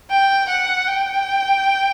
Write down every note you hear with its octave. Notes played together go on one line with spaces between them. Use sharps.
G5
F#5
G5